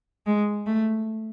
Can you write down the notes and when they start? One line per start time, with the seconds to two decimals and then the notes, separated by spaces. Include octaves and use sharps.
0.26 G#3
0.66 A3